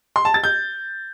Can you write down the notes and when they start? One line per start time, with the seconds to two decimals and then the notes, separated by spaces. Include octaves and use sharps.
0.16 C6
0.25 A5
0.34 A6
0.44 G6